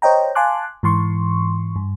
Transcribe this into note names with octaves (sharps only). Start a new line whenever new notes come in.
C5 C#5 D#5 G5 A#5
F5 G#5 A5 C6 D6 F#6
G#2 E3 C6 C#6
G2